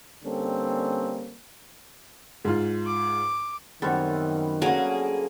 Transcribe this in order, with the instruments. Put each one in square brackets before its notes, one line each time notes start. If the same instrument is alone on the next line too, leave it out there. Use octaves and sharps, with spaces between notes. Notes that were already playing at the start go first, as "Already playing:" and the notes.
[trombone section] D3 G3 A#3 C4 C#4 A4
[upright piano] G#2 F4
[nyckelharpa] D6
[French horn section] F#2 D#3 [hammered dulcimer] G3 B3 C4 [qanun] A4 C#5
[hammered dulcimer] D3 [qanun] F#3 C#4 [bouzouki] A#3 G#4